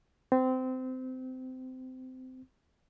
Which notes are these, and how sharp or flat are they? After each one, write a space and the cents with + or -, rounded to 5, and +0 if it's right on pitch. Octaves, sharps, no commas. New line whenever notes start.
C4 -25